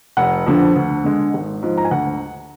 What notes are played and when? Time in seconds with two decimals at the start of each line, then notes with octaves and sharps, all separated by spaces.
0.17 F1 F#5
0.46 F2 D3 F3
0.76 D2
1.04 D3 G#3
1.34 G#1
1.62 G#2 F3
1.78 A#5
1.85 G#5
1.91 D2 F#5